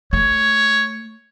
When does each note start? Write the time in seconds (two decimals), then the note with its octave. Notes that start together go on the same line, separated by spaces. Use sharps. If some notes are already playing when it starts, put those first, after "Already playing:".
0.13 A3 C#5